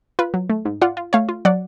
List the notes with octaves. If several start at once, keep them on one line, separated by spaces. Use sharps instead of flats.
F4 B4
F#3
A3
G#2
F4 D5 F#5
F4
A3 C#5 F5
F4
F#3 D5 F#5